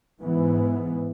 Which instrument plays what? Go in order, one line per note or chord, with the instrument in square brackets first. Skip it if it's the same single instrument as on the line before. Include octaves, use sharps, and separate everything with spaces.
[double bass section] G#2 E3 B3